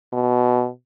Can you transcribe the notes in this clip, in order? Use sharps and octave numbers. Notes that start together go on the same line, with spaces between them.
B2